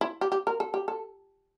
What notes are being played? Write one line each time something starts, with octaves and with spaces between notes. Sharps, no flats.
E4
G4
G4
A#4
A4
G4
A4